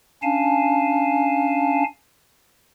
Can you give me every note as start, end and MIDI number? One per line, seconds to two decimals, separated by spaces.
0.23 1.84 61
0.23 1.84 62
0.23 1.84 77
0.23 1.84 80
0.23 1.84 81